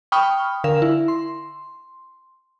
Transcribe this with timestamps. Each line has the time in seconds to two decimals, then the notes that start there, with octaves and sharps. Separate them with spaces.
0.12 G5 B5 C#6 D#6 F6
0.64 D3 A#4 F5 E7
0.82 E4
1.08 C6